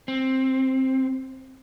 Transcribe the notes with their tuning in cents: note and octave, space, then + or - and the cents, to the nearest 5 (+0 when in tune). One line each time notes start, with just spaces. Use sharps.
C4 +10